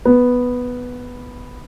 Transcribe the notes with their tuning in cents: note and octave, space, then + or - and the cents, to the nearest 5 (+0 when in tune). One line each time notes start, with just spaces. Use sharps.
B3 +0